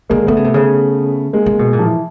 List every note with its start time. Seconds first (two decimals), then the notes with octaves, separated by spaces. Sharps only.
0.09 D3 G#3 A#3
0.27 D3 A3 B3
0.37 C#3
0.44 C3
0.54 C#3
1.33 G#3 A#3
1.46 C#3
1.59 B2
1.73 A#2
1.79 F3
1.85 E3